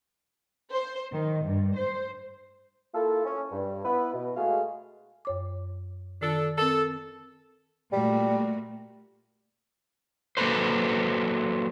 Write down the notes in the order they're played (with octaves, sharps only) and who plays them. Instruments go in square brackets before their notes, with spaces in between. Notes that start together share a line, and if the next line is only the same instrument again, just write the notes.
[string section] C5
D#3
G2
C5
[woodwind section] A#3 E4 F4 A4
C#4
G2
B3 E4 B4
B2
G#3 A3 F#4 G#4 F5
[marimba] F#2 C#5 D6
[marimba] D#3 F4 [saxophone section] D4 A4
[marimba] C4 A#4 [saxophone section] A4
[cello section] A#2 A3 F#4 [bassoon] G3
[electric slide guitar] F#3 A#3 A4 B4 C5